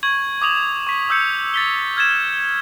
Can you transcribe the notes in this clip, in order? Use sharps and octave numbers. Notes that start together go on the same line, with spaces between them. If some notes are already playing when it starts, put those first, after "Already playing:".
C#6 G#6 F#7
D6 D#6 F7 F#7
C#6 B6
D#6 E6 G6 C#7
A6 B6 G7
F6 G#6 A6 E7